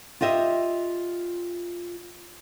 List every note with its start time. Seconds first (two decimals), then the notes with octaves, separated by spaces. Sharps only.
0.21 F4 G4 D#5 E5